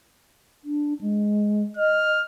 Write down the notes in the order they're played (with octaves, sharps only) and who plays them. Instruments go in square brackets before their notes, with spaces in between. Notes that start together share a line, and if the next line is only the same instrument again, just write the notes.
[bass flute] D4
G#3
[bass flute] D#5 [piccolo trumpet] F6